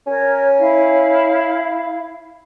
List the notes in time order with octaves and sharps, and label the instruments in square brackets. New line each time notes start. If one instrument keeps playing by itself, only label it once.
[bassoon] C#4 [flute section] A#4 C#5
[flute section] E4 F5